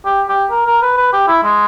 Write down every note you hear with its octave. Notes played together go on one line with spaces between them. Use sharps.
G4
G4
A#4
A#4
B4
B4
G4
E4
G#3